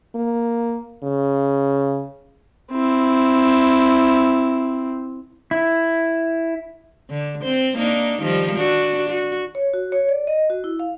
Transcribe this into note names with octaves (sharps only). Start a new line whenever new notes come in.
A#3
C#3
C4 E4
E4
D3
C4 C5
A#3 D4 D#4
D#3 F3 G3
D4 F#4
F#4
C#5
F#4
C#5
D5
D#5
F#4
E4
F5